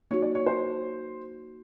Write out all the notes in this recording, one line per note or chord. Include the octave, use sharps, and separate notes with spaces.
A#3 D#4 F#4 C#5
D5
C#5
C5